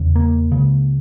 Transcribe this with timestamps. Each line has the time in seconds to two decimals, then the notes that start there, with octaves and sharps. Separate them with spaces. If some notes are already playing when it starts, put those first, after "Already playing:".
Already playing: E2 C#3
0.15 A#3
0.52 C#2 C#3